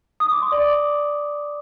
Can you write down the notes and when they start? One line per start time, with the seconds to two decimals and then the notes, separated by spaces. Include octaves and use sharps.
0.20 D#6
0.31 D6
0.42 C6
0.52 D5 D6